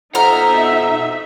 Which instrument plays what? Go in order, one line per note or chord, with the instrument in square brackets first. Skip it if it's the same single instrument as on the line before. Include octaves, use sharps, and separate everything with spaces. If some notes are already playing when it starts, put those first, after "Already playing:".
[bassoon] F2 [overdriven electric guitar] B2 F#5 [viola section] D#4 E5 [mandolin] A#5 F6